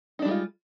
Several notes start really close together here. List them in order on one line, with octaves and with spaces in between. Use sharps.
D#4 D4 G3 G#3 F4